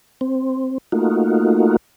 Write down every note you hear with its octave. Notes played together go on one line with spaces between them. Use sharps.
C4
A3 A#3 D#4 F4 F#4